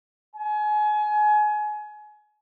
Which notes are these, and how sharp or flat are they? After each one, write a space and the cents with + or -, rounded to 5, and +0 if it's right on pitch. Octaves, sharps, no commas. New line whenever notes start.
G#5 +30